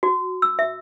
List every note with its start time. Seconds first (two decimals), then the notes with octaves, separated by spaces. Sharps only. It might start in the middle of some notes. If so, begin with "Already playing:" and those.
0.03 F#4
0.42 E6
0.59 E5